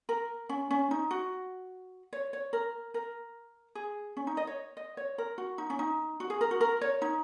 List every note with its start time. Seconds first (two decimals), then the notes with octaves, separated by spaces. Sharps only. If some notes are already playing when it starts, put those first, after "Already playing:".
0.09 A#4
0.49 C#4
0.70 C#4
0.91 D#4
1.11 F#4
2.13 C#5
2.33 C#5
2.53 A#4
2.94 A#4
3.75 G#4
4.17 C#4
4.27 D#4
4.37 D#5
4.47 C#5
4.77 D#5
4.97 C#5
5.18 A#4
5.38 F#4
5.58 D#4
5.70 C#4
5.79 D#4
6.20 F#4
6.30 G#4
6.41 A#4
6.51 F#4
6.61 A#4
6.81 C#5
7.02 D#4